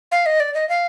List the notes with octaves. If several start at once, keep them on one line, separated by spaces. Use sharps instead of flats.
F5
D#5
D5
D#5
F5